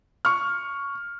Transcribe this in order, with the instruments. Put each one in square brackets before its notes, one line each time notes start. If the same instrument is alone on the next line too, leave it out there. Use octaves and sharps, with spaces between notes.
[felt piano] C#6 F6